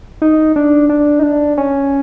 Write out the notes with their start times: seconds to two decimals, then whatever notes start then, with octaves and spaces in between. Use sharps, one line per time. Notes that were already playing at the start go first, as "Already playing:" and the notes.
0.22 D#4
0.56 D4
0.89 D4
1.19 D#4
1.23 D4
1.58 C#4